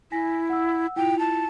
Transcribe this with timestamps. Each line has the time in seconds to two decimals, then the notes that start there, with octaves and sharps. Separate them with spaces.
0.12 E4 G#5 A#6 B6
0.49 F#5 E6
0.96 E4 F4 G5 F7
1.19 A5